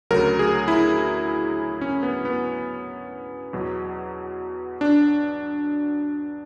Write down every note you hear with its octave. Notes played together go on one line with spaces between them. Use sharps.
D2 C#3 F#3 A#4
G#4
E4
C#4
B3
B3
E2 B2 F#3
D4